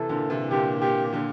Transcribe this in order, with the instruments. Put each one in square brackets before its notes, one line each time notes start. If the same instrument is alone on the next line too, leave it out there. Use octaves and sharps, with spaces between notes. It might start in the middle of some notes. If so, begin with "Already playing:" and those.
Already playing: [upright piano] C3 E3 [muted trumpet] A4
[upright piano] A#2 D3
C3 E3
[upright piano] A#2 D3 [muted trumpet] G4
[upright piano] A#2 [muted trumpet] G4
[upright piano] A#2 D3